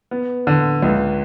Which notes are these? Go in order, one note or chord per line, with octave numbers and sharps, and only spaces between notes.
B3
D3
C#2